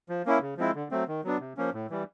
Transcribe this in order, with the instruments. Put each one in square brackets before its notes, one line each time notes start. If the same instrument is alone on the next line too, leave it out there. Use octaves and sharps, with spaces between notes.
[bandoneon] F3
A#3 C#4 E4
C#3
F3 G#3 C4 E4
D3
F#3 A3 C4
D#3
F#3 B3 D4
C3
F3 A#3 C#4
A2
E3 G3